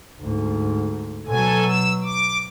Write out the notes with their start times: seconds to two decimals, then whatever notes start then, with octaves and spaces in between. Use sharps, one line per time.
0.20 D2 G#2
1.26 B2 F#3 A4 G#5
1.65 E6
2.04 D6